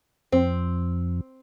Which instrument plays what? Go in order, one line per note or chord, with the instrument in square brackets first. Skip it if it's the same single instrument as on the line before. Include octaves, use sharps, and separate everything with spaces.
[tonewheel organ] F2 [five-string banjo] C4